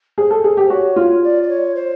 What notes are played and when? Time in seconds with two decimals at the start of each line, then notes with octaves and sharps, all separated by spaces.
0.18 G#4 C5
0.31 A4
0.44 G#4
0.57 G4
0.70 F#4 C#5
0.96 F4
1.23 D5
1.42 D5
1.49 C#5
1.75 C5